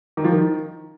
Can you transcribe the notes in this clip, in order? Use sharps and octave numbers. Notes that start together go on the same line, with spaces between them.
D#3
F3
D#3